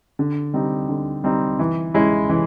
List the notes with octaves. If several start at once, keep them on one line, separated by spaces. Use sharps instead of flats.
D3
G3 C4 D#4
D3
G3 C4 D#4
E3
G#3 C#4 E4
E3